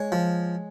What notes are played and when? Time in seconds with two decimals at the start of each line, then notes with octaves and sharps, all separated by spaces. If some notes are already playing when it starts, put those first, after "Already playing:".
Already playing: G#3 C#5
0.12 F3